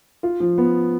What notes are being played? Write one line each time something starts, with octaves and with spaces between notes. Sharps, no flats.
F4
F3
B3